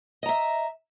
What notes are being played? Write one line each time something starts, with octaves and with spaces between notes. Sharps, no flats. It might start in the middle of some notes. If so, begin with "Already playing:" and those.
D#5 E5 A#5